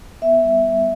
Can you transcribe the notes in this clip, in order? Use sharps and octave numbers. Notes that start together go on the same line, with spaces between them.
B3 E5
G3
G3